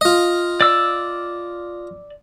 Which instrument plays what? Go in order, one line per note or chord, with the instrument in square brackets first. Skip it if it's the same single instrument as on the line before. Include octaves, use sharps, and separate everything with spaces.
[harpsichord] F4 D#5
[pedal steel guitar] D5 E6